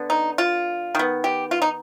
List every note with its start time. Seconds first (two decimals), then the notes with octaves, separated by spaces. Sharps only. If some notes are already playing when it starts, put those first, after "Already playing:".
Already playing: D3 B3
0.10 D#4
0.38 F4
0.95 D#3 B3
1.24 G4
1.51 F4
1.62 D#4